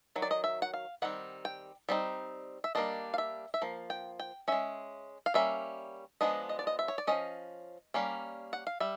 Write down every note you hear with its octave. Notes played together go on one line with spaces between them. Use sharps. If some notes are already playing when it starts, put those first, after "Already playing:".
D#3 F#3
D5
D#5
E5
F#5
F5
D#3 G3 C4 F#5
G5
G3 C4 D#4
E5
G3 A#3 D4 D#5
F5
E5
E5
F3 A#3
G5
G5
G#3 C#4 E5
F5
G3 A#3 C#4 E5
F3 G#3 B3 D4 D#5
D#5
D5
D#5
E5
C#5
D5
F3 G#3 C#4 D#5
G3 A#3 C#4
F#5
F5
G3 E5